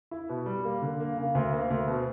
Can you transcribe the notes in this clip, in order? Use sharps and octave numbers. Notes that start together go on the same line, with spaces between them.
E4
B2
G3
A#3
D3
A#3
C#3
D2
A#3
D2
B2